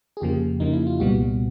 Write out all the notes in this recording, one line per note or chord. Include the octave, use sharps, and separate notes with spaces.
G#4
F2 C#3 F3 A#3 G4
F2 C#3 F3 A#3 D#4
E4
F4
C2 A#2 G3 B3 F#4